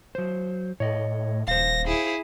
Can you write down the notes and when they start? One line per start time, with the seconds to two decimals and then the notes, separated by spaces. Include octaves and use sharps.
0.15 F#3 C5
0.80 A2 C#5 D#5
1.48 D#1 C5 F5 A#6
1.87 E4 G#4